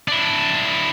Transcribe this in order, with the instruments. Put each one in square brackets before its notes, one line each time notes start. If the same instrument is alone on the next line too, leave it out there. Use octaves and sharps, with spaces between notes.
[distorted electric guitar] D4 E4